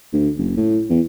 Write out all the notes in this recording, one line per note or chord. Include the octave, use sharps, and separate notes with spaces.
D2
F#1
A2
E2